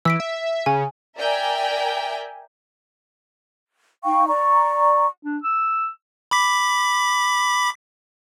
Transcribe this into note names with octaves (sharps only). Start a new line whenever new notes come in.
E3 E6 B6 D7
E5
C#3 G#5
A#4 D5 E5 G5 G#5
D#4 F5 G5 C#6
D5 A#5 C#6
D4
E6
B5 D6 B6